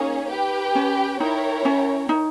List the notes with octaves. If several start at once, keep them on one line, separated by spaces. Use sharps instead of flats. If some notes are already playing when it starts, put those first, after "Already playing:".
Already playing: A#3 C#4 D#4 G#4 C#5
G4 B4 G5
C#4
D#4 E4 A#4 C#5 G5
C#4
D#4